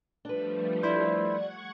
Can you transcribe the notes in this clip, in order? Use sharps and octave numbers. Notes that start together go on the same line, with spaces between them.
F3 G3 A3 D4 B4
E4 C5 D5
F#5 C#6 G#6